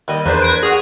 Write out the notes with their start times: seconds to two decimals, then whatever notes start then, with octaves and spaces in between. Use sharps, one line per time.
0.08 D#2 G3 D#5
0.26 E2 A#3 D4 B4 C5
0.42 G#6 A#6 D7
0.63 F#4 G#4 F6